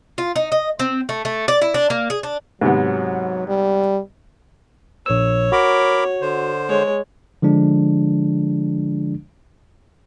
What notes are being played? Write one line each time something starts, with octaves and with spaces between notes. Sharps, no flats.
F4
D#4
D#5
C4
A3
A3
D5
E4
D4
A#3
G#4
D4
G#2 C3 F#3 B3
G3
A#1 C#5 E6
F#4 A#4 B5 D6
D3 C5
G#3 C#5
D3 F3 G#3 D4